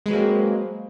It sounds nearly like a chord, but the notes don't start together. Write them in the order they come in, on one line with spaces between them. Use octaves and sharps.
G#3 B4 F#3 A#3 C4